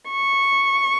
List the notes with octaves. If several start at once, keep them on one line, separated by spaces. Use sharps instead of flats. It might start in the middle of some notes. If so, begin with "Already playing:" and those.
C#6